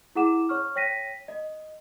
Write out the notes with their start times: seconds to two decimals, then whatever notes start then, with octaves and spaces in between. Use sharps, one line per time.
0.15 E4 G#4 F#5 D6 E7
0.49 C#5 C#6 F6
0.76 C#5 G5 A#6 B6 D#7
1.28 D#5